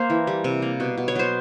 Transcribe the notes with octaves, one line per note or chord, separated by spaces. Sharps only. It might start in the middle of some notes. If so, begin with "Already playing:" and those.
Already playing: A#3 A#4 C5
E3
G3
C3
A#3
B2
B2
C#5
F#3 C5